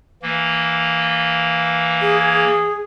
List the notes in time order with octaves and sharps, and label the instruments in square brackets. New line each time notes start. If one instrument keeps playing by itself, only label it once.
[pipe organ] E3 A#3
[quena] G#4